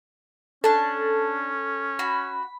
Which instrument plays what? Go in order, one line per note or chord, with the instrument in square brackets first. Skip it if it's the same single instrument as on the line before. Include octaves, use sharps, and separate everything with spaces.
[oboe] C#4 [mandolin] D4 A5 [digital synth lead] A4
[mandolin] F#4 [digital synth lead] B5